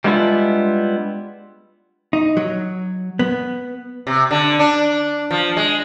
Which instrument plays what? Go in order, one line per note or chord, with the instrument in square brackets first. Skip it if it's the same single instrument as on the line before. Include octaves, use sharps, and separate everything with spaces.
[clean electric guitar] G3 G#3 B3 D4 E4 F4
[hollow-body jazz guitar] D#4
F#3
B3
[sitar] C3
D3
D4
F3
G#3